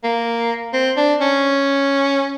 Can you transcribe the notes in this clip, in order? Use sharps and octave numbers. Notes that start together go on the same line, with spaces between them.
A#3
C4
D4
C#4